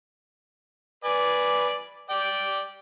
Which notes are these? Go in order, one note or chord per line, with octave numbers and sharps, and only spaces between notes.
B4 D5 G#5
D5 G5